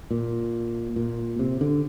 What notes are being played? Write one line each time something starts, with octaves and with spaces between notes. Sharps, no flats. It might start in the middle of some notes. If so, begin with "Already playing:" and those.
A#2
A#2
C3
D3